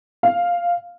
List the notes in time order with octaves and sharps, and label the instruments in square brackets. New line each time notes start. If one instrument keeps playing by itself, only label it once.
[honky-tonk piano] F5